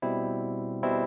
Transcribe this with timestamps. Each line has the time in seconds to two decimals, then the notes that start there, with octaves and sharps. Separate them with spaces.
0.02 B2 G3 C4 E4
0.83 B2 G3 C4 E4